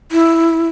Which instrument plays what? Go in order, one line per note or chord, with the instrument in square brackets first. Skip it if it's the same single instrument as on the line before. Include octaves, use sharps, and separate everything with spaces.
[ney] E4